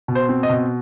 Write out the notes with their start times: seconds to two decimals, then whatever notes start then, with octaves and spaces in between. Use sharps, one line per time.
0.08 B2
0.15 C5
0.29 C4
0.43 D#5
0.49 B2